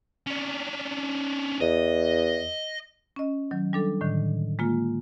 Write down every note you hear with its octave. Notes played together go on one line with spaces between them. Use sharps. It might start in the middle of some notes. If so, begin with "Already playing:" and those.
C#4 D4
E2 D#5
C#4 D#5
D#3 F#3
G3 D4 A4
A2 D3 D#3
G#3 A#3 F4